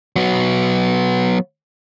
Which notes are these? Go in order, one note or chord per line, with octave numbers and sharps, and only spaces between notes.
F#3 B3